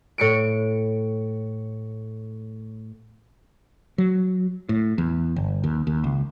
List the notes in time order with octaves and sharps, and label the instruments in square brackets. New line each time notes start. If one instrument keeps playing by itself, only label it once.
[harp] A2 C#7 D7
[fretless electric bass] F#3
A2
E2
G1
D#2
D#2
C#2